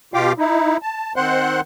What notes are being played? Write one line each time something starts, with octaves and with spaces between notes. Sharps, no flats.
B2 F4 G4 F5 G5 D6
D#4 E4
A5
D#3 C4 C5 F#5 C6 F#6